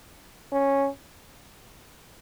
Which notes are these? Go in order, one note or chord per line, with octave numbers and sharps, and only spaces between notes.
C#4